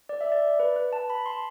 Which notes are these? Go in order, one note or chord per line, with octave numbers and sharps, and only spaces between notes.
D5
E5
D5
B4
B4
A5
B5
C6